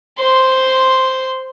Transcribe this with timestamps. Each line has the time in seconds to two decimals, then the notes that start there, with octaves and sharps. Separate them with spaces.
0.19 C5 C6